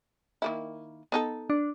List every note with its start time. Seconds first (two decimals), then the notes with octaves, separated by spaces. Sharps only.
0.42 D#3 A#3 E4
1.12 B3 D#4 A4
1.50 D4